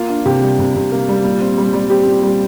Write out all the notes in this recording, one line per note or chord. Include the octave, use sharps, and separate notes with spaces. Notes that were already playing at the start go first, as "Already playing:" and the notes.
Already playing: A#3 F4
D4
C3 G4
G3
C3
C3
A#3
G3
A#2
C4
G3
G3
C4 G4
A#2
G3